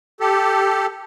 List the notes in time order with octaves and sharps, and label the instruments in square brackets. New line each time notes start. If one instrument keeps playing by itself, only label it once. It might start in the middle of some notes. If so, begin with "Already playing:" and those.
[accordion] G4 A4